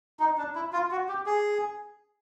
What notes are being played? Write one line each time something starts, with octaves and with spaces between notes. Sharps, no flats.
D#4
D4
E4
F4
F#4
G4
G#4